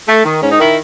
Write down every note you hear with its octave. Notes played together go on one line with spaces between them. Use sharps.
A3
D#3
G#2 C#4
D#4
D#3 E4